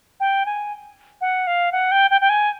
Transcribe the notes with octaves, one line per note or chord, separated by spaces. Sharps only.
G5
G#5
F#5
F5
F#5
G5
G5
G5
G#5